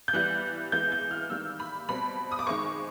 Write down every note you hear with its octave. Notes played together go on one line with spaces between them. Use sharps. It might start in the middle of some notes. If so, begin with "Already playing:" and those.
G6
E3 G3 B3 F#6
E3 G#3 B3 G6
G6
F6
D#3 G3 A#3 E6
B5
B2 G3 C4 B5
D#6
D6
D#3 G#3 C4 C#6